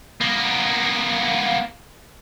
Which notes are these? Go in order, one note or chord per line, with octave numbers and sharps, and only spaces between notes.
A#3 B3